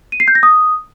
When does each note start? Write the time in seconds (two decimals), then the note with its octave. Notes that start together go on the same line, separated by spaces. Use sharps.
0.12 D#7
0.20 C7
0.28 G6
0.35 A#6
0.43 D#6